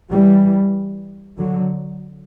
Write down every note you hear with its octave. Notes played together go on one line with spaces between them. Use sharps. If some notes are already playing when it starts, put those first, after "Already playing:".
E3 G3
D3 F#3